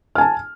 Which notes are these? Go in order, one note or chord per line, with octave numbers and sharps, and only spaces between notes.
G#5 A5 F6